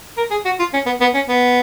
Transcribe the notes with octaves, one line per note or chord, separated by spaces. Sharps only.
A#4
G#4
F#4
F4
C#4
B3
B3
C#4
B3